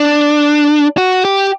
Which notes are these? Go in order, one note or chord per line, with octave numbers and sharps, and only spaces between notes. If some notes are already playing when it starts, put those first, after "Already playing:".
Already playing: D4
F#4
G4